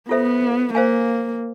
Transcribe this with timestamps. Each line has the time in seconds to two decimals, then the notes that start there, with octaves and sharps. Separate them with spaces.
0.09 B3 F4 A4 C5 E5
0.74 A#3 C5 F5 G#5